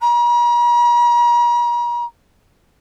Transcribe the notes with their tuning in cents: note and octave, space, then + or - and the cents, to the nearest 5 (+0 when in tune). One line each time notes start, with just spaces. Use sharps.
A#5 +45